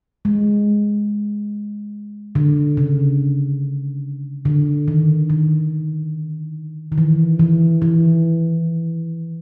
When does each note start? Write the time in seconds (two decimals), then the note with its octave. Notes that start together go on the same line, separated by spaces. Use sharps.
0.25 G#3
2.35 D3
2.77 C#3
4.45 D3
4.88 D#3
5.30 D#3
6.92 D#3
6.98 E3
7.39 E3
7.82 E3